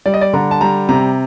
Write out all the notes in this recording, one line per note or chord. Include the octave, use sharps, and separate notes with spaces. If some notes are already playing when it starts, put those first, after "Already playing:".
G3 D5
D#5
D5
D3 A#5
A5
G3 A#5
C3 A#5